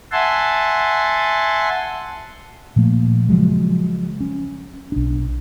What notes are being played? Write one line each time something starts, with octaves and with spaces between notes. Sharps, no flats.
E5 F#5 G#5 A5 C6
A#2 F3 A3 A#3
C#3 F3 F#3 G#3
C#4
B1 D4